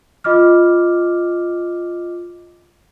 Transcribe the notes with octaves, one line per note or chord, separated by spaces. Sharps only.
F4 D#5 D6 F6